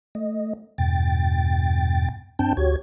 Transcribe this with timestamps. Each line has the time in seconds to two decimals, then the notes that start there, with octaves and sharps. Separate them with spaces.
0.15 A3 D#5
0.78 E2 G2 B2 G5 A6
2.39 G2 C4 D4 G5 A5 G6
2.57 D2 F#4 G4 C#5 G#6